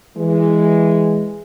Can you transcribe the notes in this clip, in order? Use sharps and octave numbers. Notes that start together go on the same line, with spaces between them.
E3 G#3